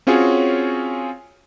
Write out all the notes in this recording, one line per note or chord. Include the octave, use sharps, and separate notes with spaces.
C4 C#4 F4 F#4 G#4 C#5